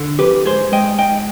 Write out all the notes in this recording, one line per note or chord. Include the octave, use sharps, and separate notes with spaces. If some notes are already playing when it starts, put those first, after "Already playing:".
Already playing: D3
F2 G4 B4
G#2 G#4 C5
G#3 D#5 G5
G#2 D#5 G5